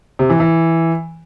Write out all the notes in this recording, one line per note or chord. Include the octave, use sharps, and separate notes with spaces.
C3
E3
E3